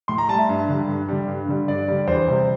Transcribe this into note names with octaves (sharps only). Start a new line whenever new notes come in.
A2 C6
A#5
G3 A5
E5
G2
D3 G3
G2
D3 G3
G2
D3 G3
G2 D5
D3 G3
E2 C5
C3 G3